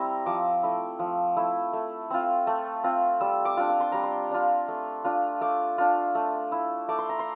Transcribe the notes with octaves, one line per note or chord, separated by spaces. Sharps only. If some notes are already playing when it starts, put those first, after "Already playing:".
Already playing: G3 C4 E4 A#5 C6
F3 D6
A3 E4
F3
A3 E4
A3
C4 F4
A3
C4 F4
G3 E6
D6
D4 F4
D6
C6
G3 A#5
C6
D4 F4
A3
D4 F4
A3 D6
D4 F4
A3
E4
A3 D6
C6
A#5
C6